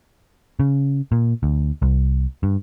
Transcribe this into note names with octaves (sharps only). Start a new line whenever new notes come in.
C#3
A#2
D2
C2
G2